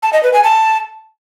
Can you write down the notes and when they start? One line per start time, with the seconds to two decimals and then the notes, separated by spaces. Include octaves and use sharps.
0.03 A5
0.13 D#5
0.23 B4
0.33 G#5
0.44 A5